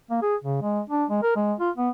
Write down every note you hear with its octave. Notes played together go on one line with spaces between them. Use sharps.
A#3
G#4
C#3
G#3
D4
G#3
A#4
G#3
F4
B3